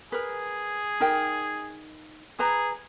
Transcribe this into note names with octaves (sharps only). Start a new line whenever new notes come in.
G#4 A#4 B4
D#4 A#4 G5
G#4 B4 A#5